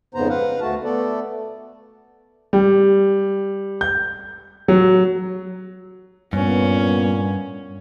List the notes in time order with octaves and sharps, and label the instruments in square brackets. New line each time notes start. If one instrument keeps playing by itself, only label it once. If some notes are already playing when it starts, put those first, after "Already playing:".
[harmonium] F2 G#2 C#3 B3 C5 A#5
B4 F5 F#5
D2 A3 F#4 A5
A3 B3 A4 D5
[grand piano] G3
G6
F#3
[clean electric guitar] G2 [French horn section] A#2 B3 [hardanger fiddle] C#4